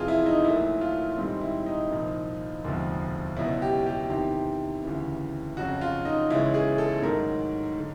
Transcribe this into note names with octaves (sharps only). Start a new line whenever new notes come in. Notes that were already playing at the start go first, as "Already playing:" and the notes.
Already playing: F2 C3 E3 F4 G#4
E4
D#4
A#1 A#2 F#3 A3 E4
F4
G#2 D#3 G3 C4
E4
D#4
C2 A#2 F3
E1 D2 C3 F3
C#2 B2 F#3 E4
G4
G4
E2 C3 D#3 G4
D2 C#3 E3
F2 C#3 F#3 F#4
F4
D#4
C#2 C#3 E3 G#3 C#4 E4
G#4
A4
G#2 D#3 F#3 A3 A#4
D3